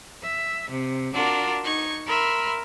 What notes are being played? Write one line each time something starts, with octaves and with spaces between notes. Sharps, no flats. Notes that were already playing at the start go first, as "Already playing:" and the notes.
E5
C3
D4 F4 F#4 A#4
D#4 C#6 G#6
A#4 E5 B5 C6